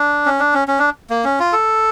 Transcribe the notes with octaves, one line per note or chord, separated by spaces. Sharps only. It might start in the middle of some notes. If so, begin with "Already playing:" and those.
Already playing: D4
C#4
D4
C#4
C#4
D4
A#3
C#4
F4
A4